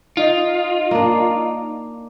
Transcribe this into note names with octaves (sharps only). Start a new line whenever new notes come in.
D#4 F4 D#5
A#3 D4